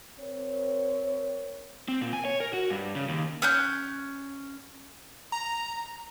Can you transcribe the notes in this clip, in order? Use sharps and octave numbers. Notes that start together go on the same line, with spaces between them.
C4 A#4 C#5
C4
A#2
G#5
C#5
A#4
F#4
G2
C#3
D#2
C#4 F#6 G6
A#5